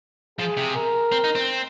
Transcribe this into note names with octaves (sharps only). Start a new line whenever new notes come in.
F3 G#4
C3
A#4
C4
D#4
C4